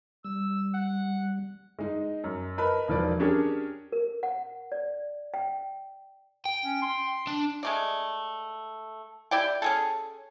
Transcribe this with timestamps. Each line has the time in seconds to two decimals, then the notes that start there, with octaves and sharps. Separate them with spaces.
0.25 G3 E6
0.74 F#5
1.79 G#3 D#4
2.24 F#2
2.58 A#4 B4 D#5 A5 B5
2.88 E1 D#3 F3 B4 D5
3.19 C#4 D4 G4 G#4 A#4 C#5
3.92 A#4
4.23 F#5
4.72 D5
5.34 G5
6.45 G5
6.65 C#4
6.82 C6
7.27 D4
7.63 G#3 A3 D5
9.31 E4 G4 D5 G5
9.62 C#4 G#4 A4